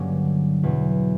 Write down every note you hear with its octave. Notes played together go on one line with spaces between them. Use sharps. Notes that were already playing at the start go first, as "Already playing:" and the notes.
Already playing: G2 D3 F#3 A#3 C#4
E2 B2 F#3